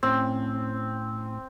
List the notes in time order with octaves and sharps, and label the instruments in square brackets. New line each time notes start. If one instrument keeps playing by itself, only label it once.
[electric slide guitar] A2 C#4 [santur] C4